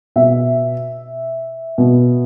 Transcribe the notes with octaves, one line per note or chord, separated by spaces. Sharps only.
B2 E5
B2